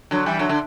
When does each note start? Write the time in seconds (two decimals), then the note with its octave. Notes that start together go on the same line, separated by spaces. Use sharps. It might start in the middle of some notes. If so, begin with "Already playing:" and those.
0.11 D3 F#3
0.26 E3 G3
0.39 D3 F#3
0.49 D3